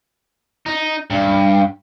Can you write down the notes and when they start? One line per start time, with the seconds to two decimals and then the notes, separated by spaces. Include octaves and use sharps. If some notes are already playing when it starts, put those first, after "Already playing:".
0.66 D#4
1.10 G2